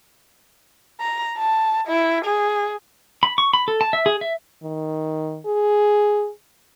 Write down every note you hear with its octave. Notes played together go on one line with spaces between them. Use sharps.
A#5
A5
E4
G#4
B5
C#6
B5
A4
A5
E5
G#4
E5
D#3
G#4